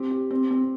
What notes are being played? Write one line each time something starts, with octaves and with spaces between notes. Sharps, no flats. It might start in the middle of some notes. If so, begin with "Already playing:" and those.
Already playing: C4 G4
G4
C4
C4